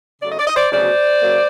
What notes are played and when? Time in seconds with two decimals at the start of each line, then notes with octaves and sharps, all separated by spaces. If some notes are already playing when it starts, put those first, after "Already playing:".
0.22 C#3 F#3 A3 D5
0.30 D#5
0.39 D5
0.47 D#5
0.56 C5 D5
0.72 D2 C#3 F#3 B3 D4 C5 D5
1.22 C#3 F#3 A#3